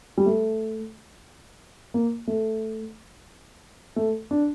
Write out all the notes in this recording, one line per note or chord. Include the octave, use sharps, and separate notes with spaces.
G3
A3
A#3
A3
A3
D4